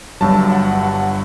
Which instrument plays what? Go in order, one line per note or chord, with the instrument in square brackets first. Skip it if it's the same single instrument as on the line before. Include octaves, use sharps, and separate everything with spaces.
[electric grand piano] G1 G2 F#3 A5
F#5
F#5